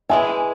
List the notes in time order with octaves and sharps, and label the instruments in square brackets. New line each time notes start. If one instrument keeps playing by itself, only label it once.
[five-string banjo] E3 G#3 E4 [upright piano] G#5